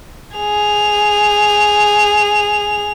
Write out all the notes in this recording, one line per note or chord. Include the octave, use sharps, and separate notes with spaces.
G#4 F7